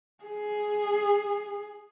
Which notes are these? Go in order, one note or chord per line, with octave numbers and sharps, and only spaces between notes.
G#4